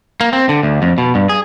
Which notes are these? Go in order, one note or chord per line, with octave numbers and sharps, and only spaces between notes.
A#3
C4
D3
D2
F2
B2
G2
G#4